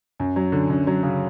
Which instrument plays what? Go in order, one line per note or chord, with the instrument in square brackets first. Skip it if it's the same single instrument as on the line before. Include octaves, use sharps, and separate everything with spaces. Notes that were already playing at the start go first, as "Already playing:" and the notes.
[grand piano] F#2
F#3
D3
F#2
F#3
C#3